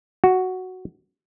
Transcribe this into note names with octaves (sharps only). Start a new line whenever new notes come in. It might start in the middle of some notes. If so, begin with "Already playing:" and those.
F#4